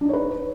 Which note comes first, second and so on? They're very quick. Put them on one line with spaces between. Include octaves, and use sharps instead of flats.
D4 D#4 C#5 B4